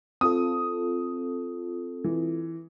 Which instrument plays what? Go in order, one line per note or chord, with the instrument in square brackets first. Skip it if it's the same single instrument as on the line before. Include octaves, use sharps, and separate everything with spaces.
[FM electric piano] C4 F4 A4 [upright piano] D#6
[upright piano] E3